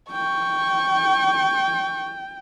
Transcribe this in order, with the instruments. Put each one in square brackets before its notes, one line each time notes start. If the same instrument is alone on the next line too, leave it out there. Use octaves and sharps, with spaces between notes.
[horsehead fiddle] G5 [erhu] C#6